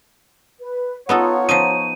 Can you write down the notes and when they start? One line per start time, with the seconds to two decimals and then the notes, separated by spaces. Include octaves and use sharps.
0.61 B4
1.09 B3 D#4 F4 A4 C#5 F#5
1.49 F3 D#4 D#7